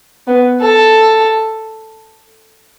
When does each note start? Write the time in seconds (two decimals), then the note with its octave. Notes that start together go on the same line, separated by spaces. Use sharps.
0.27 B3
0.61 A4